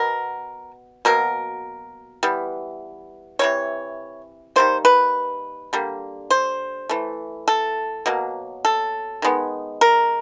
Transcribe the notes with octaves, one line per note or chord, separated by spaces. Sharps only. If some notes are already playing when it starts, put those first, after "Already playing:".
Already playing: B2 B3 A#4
B2 F#3 A#3 A#4
E3 G3 B3
C3 E3 G3 C#5
D#3 G3 A#3 C5
B4
D3 G3 A#3
C5
E3 A3
A4
B2 F#3 A#3
A4
D#3 G#3 B3
A#4